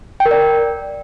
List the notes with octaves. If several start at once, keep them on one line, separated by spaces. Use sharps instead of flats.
G5
A#4
D5